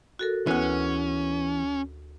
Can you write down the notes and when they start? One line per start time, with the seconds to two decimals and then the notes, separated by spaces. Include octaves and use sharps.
0.19 F#4 A4 A#4
0.47 D2 E3 B3 C#4 F#6